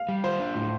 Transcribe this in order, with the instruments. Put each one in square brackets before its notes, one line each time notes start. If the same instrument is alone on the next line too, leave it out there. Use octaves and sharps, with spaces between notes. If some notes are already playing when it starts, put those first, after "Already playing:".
Already playing: [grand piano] F5
[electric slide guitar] G3
[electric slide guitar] F4 [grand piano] C5
[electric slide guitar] D4
A2